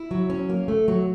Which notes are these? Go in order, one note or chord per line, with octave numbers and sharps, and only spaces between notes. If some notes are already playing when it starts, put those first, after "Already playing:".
Already playing: E4
F#3
C#4
A#3
A3
F#3